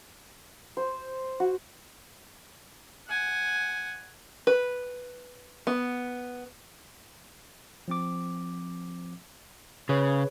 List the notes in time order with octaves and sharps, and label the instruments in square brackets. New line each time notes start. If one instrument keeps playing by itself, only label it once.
[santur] C5
F#4
[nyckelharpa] F#5 G#5
[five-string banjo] B4
B3
[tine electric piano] F3 C4 D6
[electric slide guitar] C#3 [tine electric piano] G#4 B4 C#5